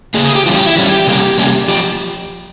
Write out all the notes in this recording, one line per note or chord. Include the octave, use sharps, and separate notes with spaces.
C#3 F3 A#3 G#4
G#4
G4
E3 G3 C#4 F4
G4
E4
E3 G3 C#4
G4
C3 G3 A#3 C#4
C3 G3 A#3 C#4
F3 G4